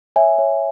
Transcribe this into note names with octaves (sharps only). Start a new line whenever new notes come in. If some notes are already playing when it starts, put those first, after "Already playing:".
C#5 E5 G#5
C#5